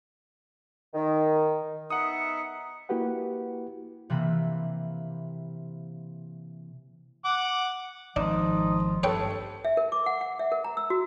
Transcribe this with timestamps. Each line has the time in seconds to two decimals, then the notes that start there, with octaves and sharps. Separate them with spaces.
0.94 D#3
1.90 B3 D#4 E5 F#5 D#6 C#7
2.89 A#3 E4 F#4 G4 B4 F#5
4.10 C3 E3 A#3 B5
7.25 F#5 D6
8.16 G#1 F3 D4 D#4
9.03 G2 A4 B4 C#5 G5
9.65 E5
9.77 A#4
9.92 D6
10.06 F#5
10.21 F#5
10.39 E5
10.52 A#4
10.64 A#5
10.77 E6
10.90 F#4